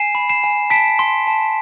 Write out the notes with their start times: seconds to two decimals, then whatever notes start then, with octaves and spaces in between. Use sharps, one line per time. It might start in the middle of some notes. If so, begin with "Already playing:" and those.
Already playing: G#5 C7 E7
0.15 B5
0.29 C7 E7
0.44 G#5
0.70 A5 B6 D7
0.99 C6
1.27 A5